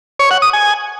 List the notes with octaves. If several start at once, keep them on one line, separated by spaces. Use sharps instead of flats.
C#5
F#5
D#6
G#5